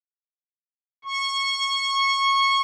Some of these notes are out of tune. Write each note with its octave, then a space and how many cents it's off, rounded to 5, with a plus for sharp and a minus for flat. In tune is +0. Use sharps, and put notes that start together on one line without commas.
C#6 -20